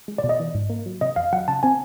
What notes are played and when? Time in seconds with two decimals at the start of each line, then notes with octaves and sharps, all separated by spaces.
0.08 G#3
0.18 D5
0.24 B2
0.29 D#5
0.40 E3
0.55 G#2
0.70 A#3
0.86 F#3
1.01 C3 D#5
1.16 F2 F5
1.33 F#3 F#5
1.48 C#3 A5
1.63 C4 G#5